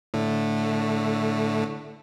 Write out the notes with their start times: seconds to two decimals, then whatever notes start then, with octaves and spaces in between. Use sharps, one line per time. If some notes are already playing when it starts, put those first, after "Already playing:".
0.14 A2 D3 A3